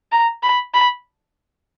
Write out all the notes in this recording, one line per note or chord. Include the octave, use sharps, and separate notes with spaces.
A#5
B5
B5